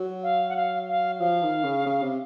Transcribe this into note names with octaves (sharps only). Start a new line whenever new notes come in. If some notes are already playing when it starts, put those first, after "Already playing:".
Already playing: F#3
F5
F#5
F5
F5
F3 F5
D#3
C#3
C#3
C3